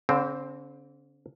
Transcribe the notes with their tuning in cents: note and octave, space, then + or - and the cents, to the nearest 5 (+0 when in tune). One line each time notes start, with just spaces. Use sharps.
D3 -45 C4 +0